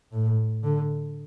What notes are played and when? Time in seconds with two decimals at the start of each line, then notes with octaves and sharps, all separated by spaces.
0.12 A2
0.63 D3